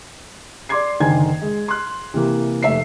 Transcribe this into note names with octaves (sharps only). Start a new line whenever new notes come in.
D5 C6 D6 G#6 C7
F#1 D3 D#3 G5 G#5 G#6
G#3
C6 F#6
C3 E3 A#3
F1 A3 E5 C7